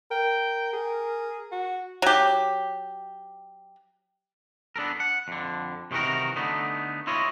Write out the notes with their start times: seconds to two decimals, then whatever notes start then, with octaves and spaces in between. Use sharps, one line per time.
0.11 A#4 G5
0.73 G#4
1.52 F#4
2.02 F#3 G4
4.76 B3 D4 A4 A#4
5.00 F#5
5.28 F2 D3
5.91 C3 D#3 E3 F#4 A#4
6.36 D3 A3 B3 D#4
7.07 E4 F4 C#5 D#5